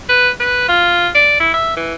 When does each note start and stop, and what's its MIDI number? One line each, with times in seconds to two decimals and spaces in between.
0.09 0.29 71
0.40 0.64 71
0.68 1.08 65
1.14 1.36 74
1.40 1.50 64
1.54 1.75 76
1.76 1.94 52